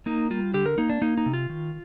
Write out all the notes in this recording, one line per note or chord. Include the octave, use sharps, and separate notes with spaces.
A#3 D#4
G3 F4
D3 G4
A#4
A#3 D#4
D4
A#3 D#4
D#4
C3
F4
D#3